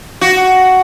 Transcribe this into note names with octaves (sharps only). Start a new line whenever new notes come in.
F#4